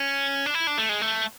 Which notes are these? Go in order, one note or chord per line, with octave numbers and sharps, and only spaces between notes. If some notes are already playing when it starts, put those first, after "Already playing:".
Already playing: C#4
D4
E4
D4
A3
G#3
A3